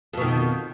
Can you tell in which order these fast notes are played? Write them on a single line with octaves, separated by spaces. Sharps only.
F2 B2 D#3